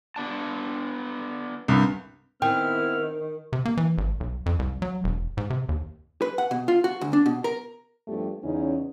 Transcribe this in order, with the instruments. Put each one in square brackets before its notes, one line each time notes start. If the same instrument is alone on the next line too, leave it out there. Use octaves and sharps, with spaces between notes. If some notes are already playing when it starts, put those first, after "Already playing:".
[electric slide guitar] B3 D4 A5
[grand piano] C2 G2
[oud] D#3 [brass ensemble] B3 C4 E4 [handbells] G5 [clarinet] F6
[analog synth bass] C3
A#3
E3
G#1
B1
F2
C2
F#3
E1
G#2
C3
D#2
[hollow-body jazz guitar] B4
F#5
B2
F4
F#4
D2
D4
B2
A#4
[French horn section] G2 F3 A3 B3 G4
E2 C#3 C#4 D#4